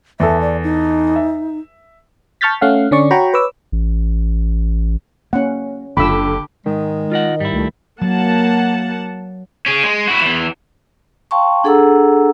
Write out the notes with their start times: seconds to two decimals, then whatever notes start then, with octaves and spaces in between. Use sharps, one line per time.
0.20 E2 A4 E5
0.41 D5
0.63 D#4
1.16 E5
2.41 A5 C#6 F6 G6 A6 B6
2.61 A3 C#4 F5 F#5
2.91 D3 C#4 D5 C#6
3.11 F#4 C#5 G5 A#5 B5 C#6
3.34 B4 C#5 D6 E6
3.72 A1
5.33 A#3 C#4 F#5
5.97 F#1 F#2 D3 F4 G4 B5 E6
6.66 G#2 D#3 G#3
7.12 F4 A#4 D#5 F#5
7.40 G#2 G3 E4
7.53 C#2 A3
8.02 F#3 A#3 F#5 A5
9.66 C#4 G#4
9.83 G#3
10.08 E4 F#4
10.21 E2 E3
11.31 F5 G5 A5 C6 C#6
11.64 D4 G#4 A4 F#5 A#5 E6